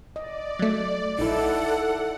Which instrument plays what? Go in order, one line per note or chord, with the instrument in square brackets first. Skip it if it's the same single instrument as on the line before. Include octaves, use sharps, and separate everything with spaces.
[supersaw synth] D5 [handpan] D#5
[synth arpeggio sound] F#3 A3
[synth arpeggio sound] A#1 [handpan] D#4 E4 [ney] A4 [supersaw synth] F#5